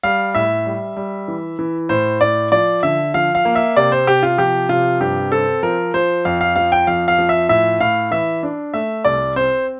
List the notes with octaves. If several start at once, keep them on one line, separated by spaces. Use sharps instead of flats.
G3 F5
A2 E5
G3
G3
E3
E3
A2 C5
A2 D5
F3 D5
D3 E5
F3 F5
F5
A#3
E5
C3 D5
C5
C3 G4
F4
F3 G4
C3 F4
G2 G4
C4 A4
F3 A#4
F3 C5
F2 F5
F5
F3 F5
G5
F2 F5
F5
F3
E5
A2 E5
A2 F5
E3 E5
D4
A3 E5
C2 D5
C4 C5